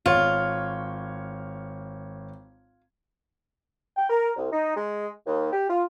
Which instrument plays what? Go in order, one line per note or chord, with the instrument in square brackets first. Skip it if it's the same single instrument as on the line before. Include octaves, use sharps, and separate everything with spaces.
[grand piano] G#1 C#5 [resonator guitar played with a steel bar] F4
[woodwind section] G5
A#4
C2
D#4
G#3
D#2
G4
F4